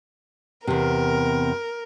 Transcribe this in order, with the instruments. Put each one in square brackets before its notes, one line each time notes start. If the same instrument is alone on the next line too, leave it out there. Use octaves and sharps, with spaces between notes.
[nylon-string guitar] E2 C3 [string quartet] A#4